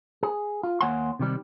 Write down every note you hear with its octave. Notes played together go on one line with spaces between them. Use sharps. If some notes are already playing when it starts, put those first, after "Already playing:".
G#4
F4
D#2 A#3 C#5 F#5 G#5 C6
C3 D#3 G3